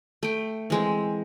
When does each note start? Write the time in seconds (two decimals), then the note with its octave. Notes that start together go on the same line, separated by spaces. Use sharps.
0.23 A3 G5
0.70 E3 G#3 C4